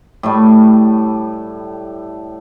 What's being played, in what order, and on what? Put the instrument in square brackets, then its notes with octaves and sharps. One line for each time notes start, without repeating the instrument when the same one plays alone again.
[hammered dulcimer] A2 G3 A3